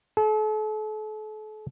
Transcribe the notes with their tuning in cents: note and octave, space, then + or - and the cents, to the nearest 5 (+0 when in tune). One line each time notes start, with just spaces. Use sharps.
A4 -40